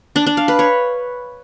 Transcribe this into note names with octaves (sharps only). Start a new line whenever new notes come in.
D4
D4
F5
B4
C#5